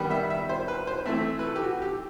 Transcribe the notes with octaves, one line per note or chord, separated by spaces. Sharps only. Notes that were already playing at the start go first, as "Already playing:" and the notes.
Already playing: D#3 G3 B3
E5
E5
C5
B4
C5
E3 A3 C4 E5
B4
A4
G4
F#4
G4